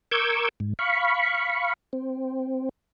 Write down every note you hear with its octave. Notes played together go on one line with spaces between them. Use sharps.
A#4 C#6 D6 E6 G6 G#6
G#2
F5 B5 C#6
C4